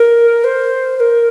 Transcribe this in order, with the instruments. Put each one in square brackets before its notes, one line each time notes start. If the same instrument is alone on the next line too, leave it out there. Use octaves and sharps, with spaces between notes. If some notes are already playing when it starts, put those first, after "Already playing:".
Already playing: [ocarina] A#4
C5
C5
A#4